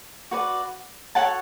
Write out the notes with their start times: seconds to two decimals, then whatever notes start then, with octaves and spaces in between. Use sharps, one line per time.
0.31 F#4 B4 D5
1.15 F#4 A4 C#5 F#5 A5